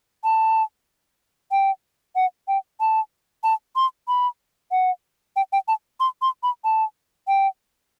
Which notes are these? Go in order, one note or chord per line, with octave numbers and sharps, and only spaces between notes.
A5
G5
F#5
G5
A5
A5
C6
B5
F#5
G5
G5
A5
C6
C6
B5
A5
G5